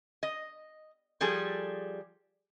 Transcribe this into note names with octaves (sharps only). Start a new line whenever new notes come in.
D#5
F3 G3 G#4 A4